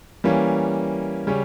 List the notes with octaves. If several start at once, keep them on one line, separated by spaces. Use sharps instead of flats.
E3 G3 A#3 C#4
C#3 G3 C#4